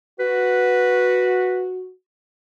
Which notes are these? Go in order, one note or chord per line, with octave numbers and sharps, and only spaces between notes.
F#4 B4